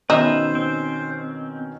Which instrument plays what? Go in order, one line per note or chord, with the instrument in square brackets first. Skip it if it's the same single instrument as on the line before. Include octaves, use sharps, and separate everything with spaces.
[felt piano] B2 D#3 C#4 [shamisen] D#4 [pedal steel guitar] B4 E5 [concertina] C5
[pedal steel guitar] C4